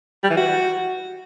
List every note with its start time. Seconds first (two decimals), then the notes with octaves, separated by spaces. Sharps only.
0.23 G3
0.30 E3
0.37 F#4